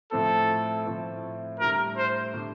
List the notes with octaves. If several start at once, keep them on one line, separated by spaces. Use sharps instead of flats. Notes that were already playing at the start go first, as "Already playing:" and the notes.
A2 F3 A3 C4 E4 A4
A2 F3 A3 C4 E4
A2 G3 D4 A#4
C5
A2 G3 D4